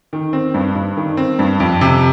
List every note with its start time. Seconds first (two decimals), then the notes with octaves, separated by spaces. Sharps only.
0.13 D#3
0.33 C4
0.54 G2
0.75 G2
0.97 D#3
1.17 C4
1.39 G2
1.60 F2
1.81 C3